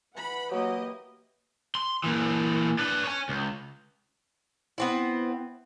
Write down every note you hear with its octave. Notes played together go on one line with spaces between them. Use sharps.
E3 F#5 B5
F#3 A#3 G4 D#5
C6
A#2 E3
D4 B4
C#5 G#5
C#2
B3 C4 E4